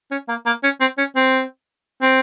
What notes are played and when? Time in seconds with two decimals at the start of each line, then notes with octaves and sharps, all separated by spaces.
0.11 C#4
0.29 A#3
0.46 A#3
0.63 C#4
0.81 C4
0.98 C#4
1.16 C4
2.02 C4